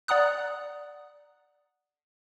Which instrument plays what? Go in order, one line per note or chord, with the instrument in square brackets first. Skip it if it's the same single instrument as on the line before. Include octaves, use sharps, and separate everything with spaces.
[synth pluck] D5 F#5 A#5 D#6 F#6